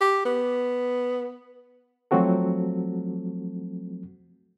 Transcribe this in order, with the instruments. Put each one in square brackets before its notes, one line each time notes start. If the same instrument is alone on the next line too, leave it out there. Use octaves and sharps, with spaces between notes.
[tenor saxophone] G4
B3
[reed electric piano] F3 F#3 A3 C4 F#4 A4